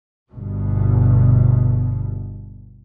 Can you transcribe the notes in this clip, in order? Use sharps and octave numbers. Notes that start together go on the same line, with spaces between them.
G1 B2